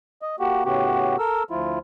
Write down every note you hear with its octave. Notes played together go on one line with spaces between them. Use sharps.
D#5
A#3 F#4 G4
A2 C#3 B3 F#4 G4
A4 A#4 E6
D2 F3 E4 F4